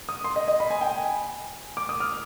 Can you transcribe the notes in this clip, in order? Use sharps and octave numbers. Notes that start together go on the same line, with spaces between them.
D#6
C6
D#5
D#5
B5
G#5
G5
G#5
D6
D#6
F6